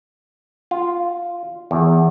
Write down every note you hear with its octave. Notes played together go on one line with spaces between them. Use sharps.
F4
E2